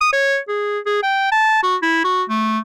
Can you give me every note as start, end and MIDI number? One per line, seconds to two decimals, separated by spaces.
0.01 0.12 87
0.13 0.38 73
0.48 0.79 68
0.86 1.01 68
1.03 1.29 79
1.32 1.62 81
1.63 1.76 66
1.82 2.01 64
2.04 2.23 66
2.29 2.59 57